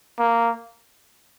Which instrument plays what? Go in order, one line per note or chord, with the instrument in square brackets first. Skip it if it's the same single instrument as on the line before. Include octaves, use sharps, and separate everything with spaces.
[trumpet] A#3